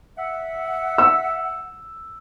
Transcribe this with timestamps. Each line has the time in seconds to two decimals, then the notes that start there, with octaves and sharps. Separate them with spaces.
0.17 E5 F#5
0.98 E6